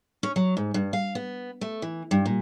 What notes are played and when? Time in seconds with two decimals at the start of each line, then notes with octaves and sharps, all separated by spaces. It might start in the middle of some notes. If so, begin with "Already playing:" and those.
0.23 C#4
0.36 F#3
0.57 G#2
0.74 G2
0.93 F5
1.15 B3
1.61 A3
1.82 E3
2.11 G2
2.26 A#2